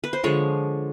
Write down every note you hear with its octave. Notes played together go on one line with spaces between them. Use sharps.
B4
C5
D3 F3 G#3 C#5